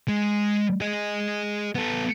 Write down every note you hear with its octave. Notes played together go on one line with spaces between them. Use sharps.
G#3
G#4 D#5
B3 A4